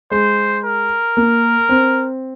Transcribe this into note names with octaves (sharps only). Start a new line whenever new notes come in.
G#3 C5
A#4
A#3
C4